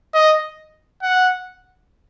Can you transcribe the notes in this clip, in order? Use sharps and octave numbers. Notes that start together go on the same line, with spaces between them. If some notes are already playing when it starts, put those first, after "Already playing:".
D#5
F#5